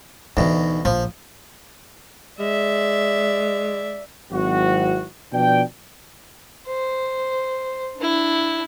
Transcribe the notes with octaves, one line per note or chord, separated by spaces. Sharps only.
D2 B2 E3 D#4
A#1 F3
G#3 D5 E5
G#1 F#3 C4 E4 F#4
B2 F3 D4 D5 G5
C5
D4 E4